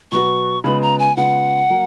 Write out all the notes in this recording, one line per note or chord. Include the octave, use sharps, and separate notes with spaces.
B2 F#3 B3 F#4 C#6
C#3 G#3 B3 F4 B5
A#5
G#5
C#3 G#3 B3 F4 F#5
F#3 A#3